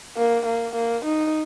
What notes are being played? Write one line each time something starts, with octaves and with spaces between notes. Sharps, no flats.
A#3
A#3
A#3
D#4